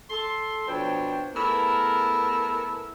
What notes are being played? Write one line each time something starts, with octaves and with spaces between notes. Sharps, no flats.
A4 C6
B2 F3 D4 C5 C#5 G5
A3 B3 E4 G#4 A#4